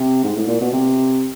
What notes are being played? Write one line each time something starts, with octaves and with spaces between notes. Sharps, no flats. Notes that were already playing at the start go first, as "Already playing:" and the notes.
Already playing: C3
G#2
A2
A#2
B2
C3